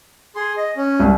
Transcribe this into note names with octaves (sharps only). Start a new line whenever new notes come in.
G#4 C6
D#5
C#4
C2